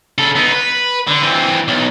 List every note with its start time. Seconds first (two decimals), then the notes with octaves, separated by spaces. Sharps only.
0.18 C#3 A4
0.36 B3 D#4
0.52 B4
1.08 D3
1.22 E3 C4
1.68 B1